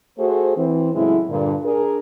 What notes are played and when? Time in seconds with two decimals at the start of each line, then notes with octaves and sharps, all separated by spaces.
0.19 A3 F#4 G#4 C5
0.57 E3 C4
0.94 A2 C#3 F#3 G#3 E4
1.30 G2 A#2 D3
1.65 D4 G#4 A#4